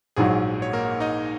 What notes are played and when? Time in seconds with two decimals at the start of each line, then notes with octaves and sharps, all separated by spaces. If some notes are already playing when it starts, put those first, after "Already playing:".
0.16 A#1 G#2 F#3 G#4
0.62 C#5
0.73 A#3 A#4
1.00 D#4 D#5